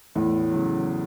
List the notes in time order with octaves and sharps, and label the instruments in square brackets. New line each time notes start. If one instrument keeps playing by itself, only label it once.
[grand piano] E2 [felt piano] A2
[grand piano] C#3 F#3